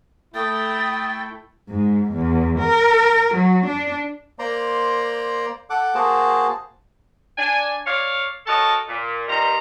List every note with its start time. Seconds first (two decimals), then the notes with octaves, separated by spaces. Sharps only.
0.35 A3 E4 G5 D#6 A6
1.70 G#2
2.13 E2
2.60 A#4
3.35 F#3
3.67 D4
4.39 A#3 C5 D5 A#5 C6
5.70 A4 F#5 D6
5.95 A#3 F#4 G#4 C5 A5
7.38 D4 G#5
7.86 C#5 D5 F5
8.47 F#4 A4 A#4 C#5 D#5 A5
8.88 A#2
9.28 G2 D#3 G3 C5 A#5